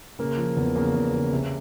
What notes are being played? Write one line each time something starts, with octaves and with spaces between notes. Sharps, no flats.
C#3 A#3
F3
E2
C#3 A#3
E2
C#3
C3